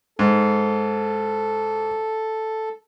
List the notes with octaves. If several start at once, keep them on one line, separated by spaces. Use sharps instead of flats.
G#2 A4